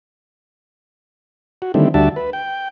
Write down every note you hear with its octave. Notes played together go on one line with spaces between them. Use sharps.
F#4
D3 D#3 G3 A3 C4 E4
D2 G3 D4 F#4 E5 A5
B4
G5